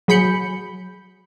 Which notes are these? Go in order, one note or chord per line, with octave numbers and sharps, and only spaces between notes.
F#3 G#4 B5 G6 C#7